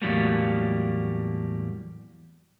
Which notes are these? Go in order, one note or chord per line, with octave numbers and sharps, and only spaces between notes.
E2 A2 F#3 G3 A3 A#3